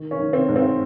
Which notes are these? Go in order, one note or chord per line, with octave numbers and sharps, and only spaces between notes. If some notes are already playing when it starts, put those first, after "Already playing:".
Already playing: D#3
C#4
D#3
C4
G#2
C4